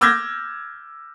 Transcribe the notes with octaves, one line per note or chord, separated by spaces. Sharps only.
D6 E6 F6 G6 G#6 A#6